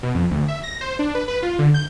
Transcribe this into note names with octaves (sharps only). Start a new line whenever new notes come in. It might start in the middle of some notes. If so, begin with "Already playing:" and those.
B2
F2
D2
E5
A#6
C5
D4
B4
B4
F4
D3
G6